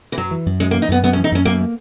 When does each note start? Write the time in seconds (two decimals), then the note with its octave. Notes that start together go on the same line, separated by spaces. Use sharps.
0.12 E3
0.18 F#2 F#3
0.31 E3
0.46 F#2
0.60 F#2 G#3
0.71 A#3
0.74 E3
0.82 D#4
0.89 F#2 B3
1.03 F#2 B3
1.13 C#4
1.17 E3
1.24 D#4
1.32 F#2 C#4
1.45 F#2 A#3
1.61 A#3